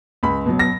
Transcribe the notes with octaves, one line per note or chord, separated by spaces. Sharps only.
C#2 B5
B2 F#3
A#6